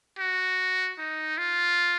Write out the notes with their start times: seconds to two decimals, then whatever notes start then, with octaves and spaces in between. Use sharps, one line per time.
0.19 F#4
0.99 D#4
1.38 F4